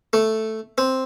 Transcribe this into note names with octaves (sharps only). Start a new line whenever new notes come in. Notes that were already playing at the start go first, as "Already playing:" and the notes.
A3
C4